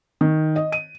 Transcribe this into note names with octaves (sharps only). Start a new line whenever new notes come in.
D#3
D#5
D#7